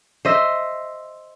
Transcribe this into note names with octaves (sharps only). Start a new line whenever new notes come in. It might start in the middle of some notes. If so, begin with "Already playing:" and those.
C5 D#5 E5